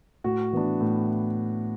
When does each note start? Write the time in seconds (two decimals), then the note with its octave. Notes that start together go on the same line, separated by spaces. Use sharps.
0.24 A2 F#4
0.53 E3 B3 D4
0.81 A2